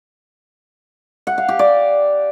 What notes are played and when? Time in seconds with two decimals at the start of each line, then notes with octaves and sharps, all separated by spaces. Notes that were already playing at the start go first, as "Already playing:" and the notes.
1.27 F#5
1.38 F5
1.48 G4
1.59 D5